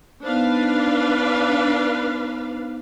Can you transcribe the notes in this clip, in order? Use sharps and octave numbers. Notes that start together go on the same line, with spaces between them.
B3 D4 D#4 B4 C5 F5